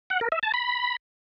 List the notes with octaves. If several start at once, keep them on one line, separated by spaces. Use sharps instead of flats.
F#5
A#4
E5
A5
B5